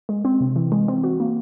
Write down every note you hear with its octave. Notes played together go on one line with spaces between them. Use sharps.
G#3
C4
C3
E3
G#3
C4
F#4
A#3